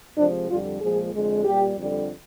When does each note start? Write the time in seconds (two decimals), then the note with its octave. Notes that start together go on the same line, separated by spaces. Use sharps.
0.17 C3 F3 G#3 D4
0.49 F2 D3 G3 F4
0.81 A#2 F3 G#3 G#4
1.13 F2 D3 G#3
1.45 A#2 G3 G4
1.77 F2 D3 G3